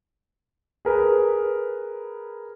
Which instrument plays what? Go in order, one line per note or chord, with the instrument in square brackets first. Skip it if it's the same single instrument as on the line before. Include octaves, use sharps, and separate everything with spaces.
[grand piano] G#4 A#4 B4